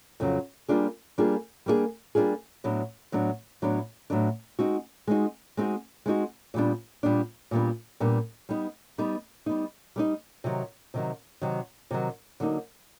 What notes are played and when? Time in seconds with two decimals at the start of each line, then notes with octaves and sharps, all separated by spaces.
0.20 F2 C#3 F#3
0.68 G3 A#3 D4 F4 G#4
1.18 G3 A#3 D4 F4 G#4
1.66 G3 A#3 D4 F4 G#4
2.15 G3 A#3 D4 F4 G#4
2.64 A2 F#3 B3 D4
3.12 A2 F#3 B3 D4
3.62 A2 F#3 B3 D4
4.10 A2 F#3 B3 D4
4.59 G#3 C4 D#4 F#4
5.07 G#3 C4 D#4 F#4
5.57 G#3 C4 D#4 F#4
6.06 G#3 C4 D#4 F#4
6.54 A#2 G3 B3 D4
7.03 A#2 G3 B3 D4
7.51 A#2 G3 B3 D4
8.00 A#2 G3 B3 D4
8.49 G3 B3 D#4
8.98 G3 B3 D#4
9.46 G3 B3 D#4
9.96 G3 B3 D#4
10.44 C3 D#3 F#3
10.94 C3 D#3 F#3
11.41 C3 D#3 F#3
11.91 C3 D#3 F#3
12.40 D3 F#3 A#3 D#4